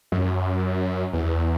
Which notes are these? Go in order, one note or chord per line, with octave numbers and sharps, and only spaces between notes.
F#2
E2